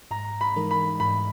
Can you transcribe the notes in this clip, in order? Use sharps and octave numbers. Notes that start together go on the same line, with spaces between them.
G#2 A#5
B5
E3 G#3 D#4 A#4
B5
G#2 B5